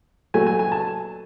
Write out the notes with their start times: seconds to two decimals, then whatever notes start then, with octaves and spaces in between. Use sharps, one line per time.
0.34 A#2 F#3 A3 G#5
0.47 G#5
0.59 G#5
0.72 A5